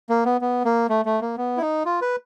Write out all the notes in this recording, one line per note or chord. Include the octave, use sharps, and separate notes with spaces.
A#3
B3
B3
A#3
A3
A3
A#3
B3
E4
D#4
F4
B4